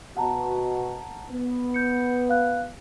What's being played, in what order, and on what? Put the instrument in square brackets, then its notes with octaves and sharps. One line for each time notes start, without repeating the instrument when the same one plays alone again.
[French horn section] B2 F#4 [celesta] F#5 A5 A#5
[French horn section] B3
[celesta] G6 C#7
F5 F#6